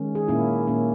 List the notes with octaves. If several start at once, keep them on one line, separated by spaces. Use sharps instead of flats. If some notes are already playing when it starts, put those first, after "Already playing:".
Already playing: D#3 G#3 C#4
G#4
A#2 A#3 C#4 E4
A#2 A#3 C#4